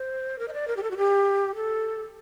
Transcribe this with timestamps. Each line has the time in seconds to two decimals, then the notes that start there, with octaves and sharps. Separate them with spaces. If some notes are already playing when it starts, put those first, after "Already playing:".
Already playing: C5
0.39 A#4
0.48 D#5
0.53 D5
0.68 A#4
0.77 G4
0.83 A4
0.91 F#4
0.97 G4
1.55 A4